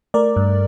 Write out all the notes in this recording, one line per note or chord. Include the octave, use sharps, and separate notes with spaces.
A3 A#4 D5
G2